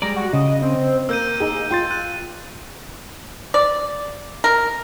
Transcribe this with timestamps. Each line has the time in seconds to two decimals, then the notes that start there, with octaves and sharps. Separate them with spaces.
0.02 G3 G#3 D5 A#5
0.16 F#4
0.33 C#3 D#5
0.62 C4
1.09 A#3 A#4 E6 G6 D#7
1.40 D#4 G#4
1.71 F4 G5 C6 A6
1.91 F#6 D#7
3.54 D5
4.44 A#4